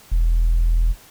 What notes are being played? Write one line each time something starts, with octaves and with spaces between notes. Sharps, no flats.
E1